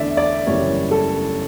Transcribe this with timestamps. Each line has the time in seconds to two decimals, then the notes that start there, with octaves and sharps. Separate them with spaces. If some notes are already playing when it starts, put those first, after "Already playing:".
Already playing: E2 D3 A3 D4 D5 E5
0.17 D5
0.47 F#1 F#2 E3 G3 C#4 C#5
0.91 A4